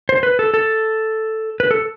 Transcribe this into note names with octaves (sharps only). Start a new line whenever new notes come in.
C5
B4
A4
A4
B4
A4